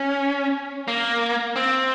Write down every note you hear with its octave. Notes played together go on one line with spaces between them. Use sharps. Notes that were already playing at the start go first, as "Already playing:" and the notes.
Already playing: C#4
A#3
C4